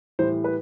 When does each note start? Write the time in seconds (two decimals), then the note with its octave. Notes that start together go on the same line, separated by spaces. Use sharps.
0.19 A2 E3 G3 C5
0.44 B4